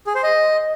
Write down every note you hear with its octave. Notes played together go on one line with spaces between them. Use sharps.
G#4
C5
D#5